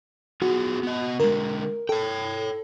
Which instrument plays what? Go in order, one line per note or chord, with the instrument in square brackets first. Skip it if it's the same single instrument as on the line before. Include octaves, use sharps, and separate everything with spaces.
[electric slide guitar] B3 F4 G#4 [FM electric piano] F#4
[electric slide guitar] B3 D#5
[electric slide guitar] D3 G#3 [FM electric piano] A#4
[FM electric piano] A4 [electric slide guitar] C#5 G5